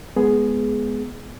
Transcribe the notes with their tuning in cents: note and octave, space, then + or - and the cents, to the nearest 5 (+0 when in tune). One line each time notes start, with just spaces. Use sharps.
G#3 +20 B3 +0 G#4 +10